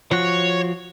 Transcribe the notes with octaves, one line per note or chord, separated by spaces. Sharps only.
F3 F#4 C#5